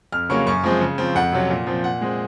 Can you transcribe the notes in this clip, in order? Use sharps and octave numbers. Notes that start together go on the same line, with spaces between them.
F2 F6
C#3 F#3 A#3 C#4 C#6
F#2 C#6
F3 G#3 C4
C#3
F3 C4
F2 F#5
C3 F#3 C#4
A#2
F3 C4
A#2 F#5
G#3 C4